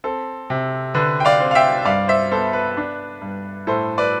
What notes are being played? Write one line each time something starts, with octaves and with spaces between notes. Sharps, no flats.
C4 A4
C3
D3 B4
G5
D5 F5
C4
F5
E5 G5
G2 D5 F5
C5 E5
B3 A4 C5
B4
D4
G2
A2 A4 C5
B4 D5